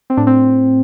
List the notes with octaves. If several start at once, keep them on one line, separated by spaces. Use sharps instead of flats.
C4
A2 D4
C4